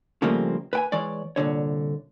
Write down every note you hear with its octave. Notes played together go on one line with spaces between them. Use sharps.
C#3 F3 G3 A3 A#3 C4
B4 G5 G#5
E3 G#3 C#5 D5
C2 A#2 D3 C#5